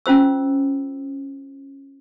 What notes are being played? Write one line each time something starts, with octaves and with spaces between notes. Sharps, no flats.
C#4 F4 C5 E6